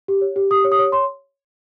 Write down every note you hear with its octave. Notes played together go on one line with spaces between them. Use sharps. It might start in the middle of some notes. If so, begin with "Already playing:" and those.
G4
C#5
G4
G4 D#6
C#5
D#6
C#5
C#5 C6